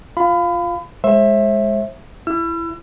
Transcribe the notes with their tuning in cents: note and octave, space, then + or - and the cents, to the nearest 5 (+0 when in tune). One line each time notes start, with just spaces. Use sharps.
F4 +0 F5 +0 B5 +30
G#3 +0 C5 +40 E5 +0
E4 +15 E6 +40